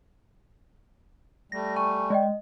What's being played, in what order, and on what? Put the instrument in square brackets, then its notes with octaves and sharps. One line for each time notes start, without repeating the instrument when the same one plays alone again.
[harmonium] G3 A3 [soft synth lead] A#6
[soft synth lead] G#5 [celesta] C#6
[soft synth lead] G#3 [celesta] D5 D#5 G5
[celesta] D#5